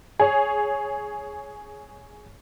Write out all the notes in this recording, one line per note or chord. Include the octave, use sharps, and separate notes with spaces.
G#4 C#5